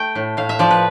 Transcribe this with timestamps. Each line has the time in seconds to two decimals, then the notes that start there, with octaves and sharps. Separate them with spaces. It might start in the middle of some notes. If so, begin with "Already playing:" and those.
Already playing: A3 G5
0.15 A2
0.37 A2 F5
0.49 E5
0.59 F3 D5
0.71 B4